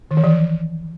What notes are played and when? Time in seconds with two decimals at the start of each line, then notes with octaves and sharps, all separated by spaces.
0.11 D#3
0.17 E3
0.24 F3